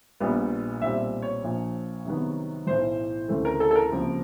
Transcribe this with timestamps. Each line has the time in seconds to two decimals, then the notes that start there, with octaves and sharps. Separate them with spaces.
0.20 A#1 A#2 G3 B3
0.81 B1 A#2 G3 C4 E5
1.22 C#5
1.43 A#1 A#2 F3
2.05 C2 C3 D#3 F#3 B3
2.67 B1 A2 E3 C5
3.28 D2 C#3 E3 A3 C4
3.45 A#4
3.60 A4
3.71 A4
3.76 A#4
3.91 C#2 C3 F3 A#3